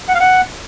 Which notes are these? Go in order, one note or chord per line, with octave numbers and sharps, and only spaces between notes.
F#5
F5
F#5